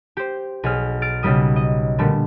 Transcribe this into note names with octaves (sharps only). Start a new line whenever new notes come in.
G4 C5
B1 G#4 F6
F6 A6 D7
B1 C#3 G3 D#6
D#5
A#2 D3 G3 A3 B3